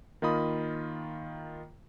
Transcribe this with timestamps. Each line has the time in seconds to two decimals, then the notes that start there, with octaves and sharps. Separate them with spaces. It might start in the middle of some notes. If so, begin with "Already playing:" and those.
0.22 D#3 A#3 F4 D#5 B5 D#6